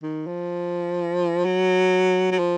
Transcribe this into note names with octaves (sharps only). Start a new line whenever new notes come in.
D#3
F3
F#3
F#3
F3